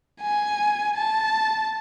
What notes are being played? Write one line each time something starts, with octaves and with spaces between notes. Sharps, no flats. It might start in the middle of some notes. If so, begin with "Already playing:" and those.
G#5
A5